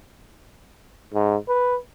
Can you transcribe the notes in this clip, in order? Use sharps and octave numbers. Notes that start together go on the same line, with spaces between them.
G#2
B4